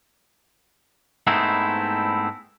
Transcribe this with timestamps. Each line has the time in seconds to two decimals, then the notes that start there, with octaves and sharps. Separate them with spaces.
1.27 G#2 A3 B3 C4 D#4 E4